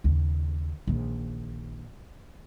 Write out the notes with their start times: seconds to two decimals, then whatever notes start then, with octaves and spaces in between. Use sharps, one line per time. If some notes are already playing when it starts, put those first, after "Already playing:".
0.04 D#2 C#3
0.87 A#1 D#3